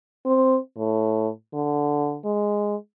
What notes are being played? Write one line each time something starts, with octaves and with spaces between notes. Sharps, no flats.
C4
A2
D3
G#3